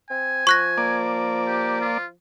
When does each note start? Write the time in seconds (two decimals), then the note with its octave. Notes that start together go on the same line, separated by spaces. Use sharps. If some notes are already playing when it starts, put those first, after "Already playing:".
0.10 C4 G#5
0.47 F3 C#6 F#6 A#6
0.78 A#3 D5
1.47 G4
1.81 F4